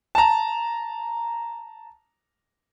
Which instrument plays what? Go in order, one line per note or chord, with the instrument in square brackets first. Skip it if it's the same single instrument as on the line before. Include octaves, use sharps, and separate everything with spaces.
[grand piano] A5 A#5